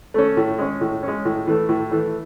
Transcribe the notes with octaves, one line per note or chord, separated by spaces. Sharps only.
A3 C#4
A2
G#3 C#4
A2
G#3 C#4
A2
E3 A3
A2
E3 A3